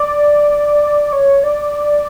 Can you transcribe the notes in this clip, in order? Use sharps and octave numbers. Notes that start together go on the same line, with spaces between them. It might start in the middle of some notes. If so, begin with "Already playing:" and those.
Already playing: D5
C#5
D5